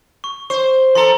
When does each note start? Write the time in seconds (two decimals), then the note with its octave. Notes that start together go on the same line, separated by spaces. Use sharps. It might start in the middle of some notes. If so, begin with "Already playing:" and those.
0.24 C#6
0.50 C5 C#6
0.95 F3 A4 A#5 C6